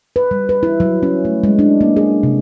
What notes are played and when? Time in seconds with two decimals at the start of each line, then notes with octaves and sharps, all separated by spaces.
0.16 B4
0.31 G3
0.49 B4
0.63 E4
0.80 F#3
1.03 C#4
1.25 A3
1.44 G#3
1.59 D4
1.81 A#3
1.97 G#4
2.23 C3